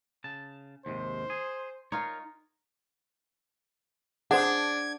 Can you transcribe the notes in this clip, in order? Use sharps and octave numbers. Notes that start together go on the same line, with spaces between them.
C#3 A5
D#2 G#2 C3 C5
G#4
D#4 F4 A#4 C#5
D4 G#4 C5 F#5 G#6